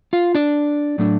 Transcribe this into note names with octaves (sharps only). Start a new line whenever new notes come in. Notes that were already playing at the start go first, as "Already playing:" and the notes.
F4 F5
D4 D5
A2 F#3 A3 D4